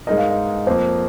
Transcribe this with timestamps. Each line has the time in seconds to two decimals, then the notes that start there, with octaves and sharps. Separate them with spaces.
0.07 G#2 G#3 D#4 A#4 D#5
0.17 F5
0.29 D#5
0.67 F2 F3 A#3 C5